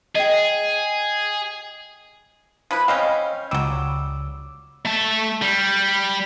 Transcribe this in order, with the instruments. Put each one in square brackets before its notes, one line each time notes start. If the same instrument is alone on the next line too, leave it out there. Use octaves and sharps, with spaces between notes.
[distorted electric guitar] G#4 [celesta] D#5 G5
[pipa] F3 E4 B4
[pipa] C4 C#4 G5 [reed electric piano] D#5 F5
[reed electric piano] C#2 D6 E6 [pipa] F#3 G3
[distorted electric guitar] A3 A5
G3